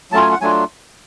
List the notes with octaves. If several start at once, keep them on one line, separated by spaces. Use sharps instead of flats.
F#3 A3 C#4 F4 A5
G#5
F#5
F#3 A3 D4 F4 G#5